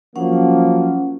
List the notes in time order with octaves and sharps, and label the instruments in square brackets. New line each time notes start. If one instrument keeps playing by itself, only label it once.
[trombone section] F3 F#3 A#3 [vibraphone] C#4 F#5